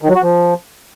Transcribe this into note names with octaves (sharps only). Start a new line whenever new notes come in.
D#3
F#3
F#4
F3